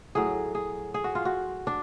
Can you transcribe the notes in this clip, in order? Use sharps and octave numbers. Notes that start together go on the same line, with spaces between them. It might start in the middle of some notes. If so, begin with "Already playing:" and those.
A2 F#3 G#4
G#4
G#4
F#4
F4
F#4
D4